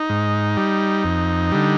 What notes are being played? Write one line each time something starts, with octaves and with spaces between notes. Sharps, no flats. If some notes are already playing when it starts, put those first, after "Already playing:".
Already playing: D#4
G#2
G3
F2
D3 G3